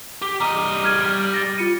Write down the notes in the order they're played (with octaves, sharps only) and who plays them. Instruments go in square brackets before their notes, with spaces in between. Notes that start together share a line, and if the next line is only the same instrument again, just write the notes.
[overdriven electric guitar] G4
[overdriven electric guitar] G3 D#5 [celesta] A#5
[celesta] F6 G#6 D#7
A6 A#6
F4 C#7 D#7